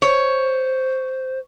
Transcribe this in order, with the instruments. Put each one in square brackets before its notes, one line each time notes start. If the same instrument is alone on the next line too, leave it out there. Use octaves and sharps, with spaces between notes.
[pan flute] C5 [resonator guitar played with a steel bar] C#5